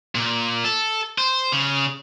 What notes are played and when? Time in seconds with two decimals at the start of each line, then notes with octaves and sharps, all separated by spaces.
0.15 A#2
0.65 A4
1.18 C5
1.52 C#3